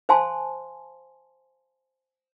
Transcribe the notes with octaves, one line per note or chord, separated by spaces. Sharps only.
C5 F5 G#5 A5 C6